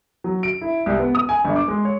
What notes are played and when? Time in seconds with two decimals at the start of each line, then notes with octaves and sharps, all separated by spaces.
0.24 F#3
0.43 D7
0.61 E4
0.86 C2
0.99 B3
1.15 D#6
1.29 G#5
1.45 G1
1.56 D6
1.68 G#3
1.85 C#5